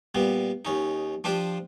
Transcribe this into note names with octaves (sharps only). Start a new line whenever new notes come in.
A#2 G3 B3
D#2 C#4 D#4
F3 D4 F4 G4 C5